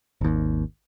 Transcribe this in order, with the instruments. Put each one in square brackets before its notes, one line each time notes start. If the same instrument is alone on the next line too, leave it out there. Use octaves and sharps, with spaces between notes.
[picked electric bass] G#1 D#2